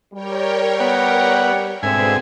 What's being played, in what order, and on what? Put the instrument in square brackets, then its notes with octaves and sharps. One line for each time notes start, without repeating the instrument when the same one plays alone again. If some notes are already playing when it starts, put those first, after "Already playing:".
[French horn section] G3 [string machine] A#4 C#5 G5
[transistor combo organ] B3 [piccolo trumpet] F#5
[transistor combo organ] G#2 G#5 [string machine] B2 B3 G#4 [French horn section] D3 C4 [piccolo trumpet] E5